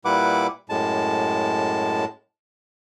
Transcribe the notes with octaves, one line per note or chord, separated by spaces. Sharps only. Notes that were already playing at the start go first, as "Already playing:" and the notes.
A#2 G3 E4 B4 F#5 D6
F#2 A2 G#3 A5